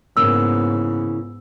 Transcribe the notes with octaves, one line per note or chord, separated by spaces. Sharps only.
G#2 C#3 E3 A#3 B3 E6